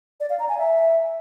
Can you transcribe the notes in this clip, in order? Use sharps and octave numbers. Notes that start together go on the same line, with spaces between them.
D5
F5
A#5
G#5
E5